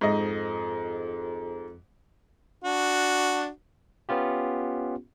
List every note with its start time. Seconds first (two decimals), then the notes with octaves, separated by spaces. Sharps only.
0.01 F2 G#2 D#5
2.64 D4 F#4
4.09 B3 C#4 F4 G4